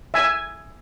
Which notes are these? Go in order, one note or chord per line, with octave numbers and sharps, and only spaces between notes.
E5 G#5